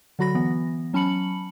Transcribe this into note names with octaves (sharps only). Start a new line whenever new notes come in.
D3 F#3 F#4 B5 A#6
E3 B3
F#3 C#4 A5 B5 C#7 F#7